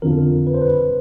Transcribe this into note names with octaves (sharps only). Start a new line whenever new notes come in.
F2 D3 F3 A#4
B4
C5
B4